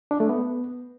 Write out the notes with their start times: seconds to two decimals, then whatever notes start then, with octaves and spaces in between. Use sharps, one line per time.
0.11 D4
0.20 A3
0.29 B3